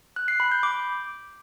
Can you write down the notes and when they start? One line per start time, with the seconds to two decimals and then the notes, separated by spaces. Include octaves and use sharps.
0.16 F#6
0.28 C7
0.40 B5
0.51 G6
0.63 D6